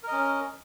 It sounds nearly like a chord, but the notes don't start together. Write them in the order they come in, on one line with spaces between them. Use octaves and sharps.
A#4 D#5 C#4